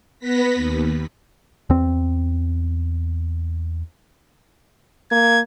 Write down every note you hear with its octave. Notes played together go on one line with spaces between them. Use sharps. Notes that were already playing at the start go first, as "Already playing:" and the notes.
B3 B4 A#6 B6
D#2
E2 C4
A#3 G#6